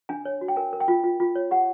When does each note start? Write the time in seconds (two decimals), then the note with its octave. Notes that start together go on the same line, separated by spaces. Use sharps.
0.09 D4 G#5
0.25 C#5
0.41 F#4
0.48 G5
0.56 A#4 G#5
0.73 A#4
0.80 G5
0.88 F4
1.04 F4
1.20 F4
1.35 C#5
1.51 G4 F#5